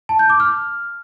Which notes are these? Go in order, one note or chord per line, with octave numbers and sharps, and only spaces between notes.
A5
G6
D6
F6